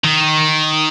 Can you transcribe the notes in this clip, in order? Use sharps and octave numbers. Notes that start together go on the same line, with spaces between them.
D#3